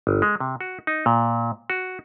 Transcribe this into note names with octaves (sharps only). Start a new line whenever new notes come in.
G1
G#3
C3
F#4
D#4
A#2
F#4